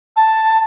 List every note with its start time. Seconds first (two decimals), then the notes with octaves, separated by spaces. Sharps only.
0.17 A5